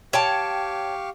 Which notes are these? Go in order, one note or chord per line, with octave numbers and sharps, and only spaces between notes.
G4 C#5 F5 G5 A5 C#6